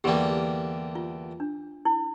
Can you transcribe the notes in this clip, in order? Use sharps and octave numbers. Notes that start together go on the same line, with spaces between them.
E2 D3 G3 A#3 G4
F4
D4
E4